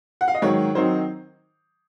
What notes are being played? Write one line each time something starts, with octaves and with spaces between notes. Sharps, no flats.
F#5
F5
D#5
G#2 D#3 F#3 C#5
D#3 F#3 C4 D#4 C5